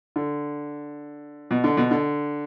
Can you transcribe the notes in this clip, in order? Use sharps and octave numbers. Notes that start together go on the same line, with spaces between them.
D3
B2
D3
B2
D3